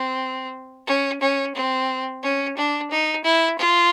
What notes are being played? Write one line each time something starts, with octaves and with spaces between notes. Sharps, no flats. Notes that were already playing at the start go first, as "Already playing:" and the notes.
Already playing: C4
C#4
C#4
C4
C#4
D4
D#4
E4
F4